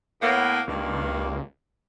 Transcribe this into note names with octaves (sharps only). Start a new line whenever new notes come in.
A2 A#3 B3
C#2 G2 D#3 A#3